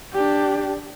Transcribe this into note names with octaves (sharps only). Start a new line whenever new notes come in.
D4 G4